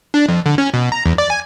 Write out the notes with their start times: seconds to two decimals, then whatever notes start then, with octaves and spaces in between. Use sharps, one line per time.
0.14 D4
0.29 F2
0.46 D3
0.58 C#4
0.74 B2
0.92 A#5
1.06 E2
1.18 D5
1.30 G#5